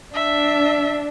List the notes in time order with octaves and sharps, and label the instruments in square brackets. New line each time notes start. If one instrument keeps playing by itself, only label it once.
[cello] D4 [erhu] E5